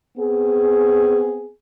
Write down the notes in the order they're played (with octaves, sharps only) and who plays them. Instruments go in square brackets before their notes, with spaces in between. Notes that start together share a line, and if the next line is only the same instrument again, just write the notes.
[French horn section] B3 C4 G#4